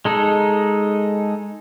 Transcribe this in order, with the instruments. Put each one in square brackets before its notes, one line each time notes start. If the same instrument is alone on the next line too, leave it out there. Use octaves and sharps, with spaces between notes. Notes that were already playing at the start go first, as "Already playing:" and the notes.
[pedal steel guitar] G#3 D#4 A4